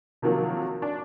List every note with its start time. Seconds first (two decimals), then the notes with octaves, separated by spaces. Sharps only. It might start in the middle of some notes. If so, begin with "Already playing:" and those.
0.22 C3 D#3 F3 F#3 A#3
0.82 D4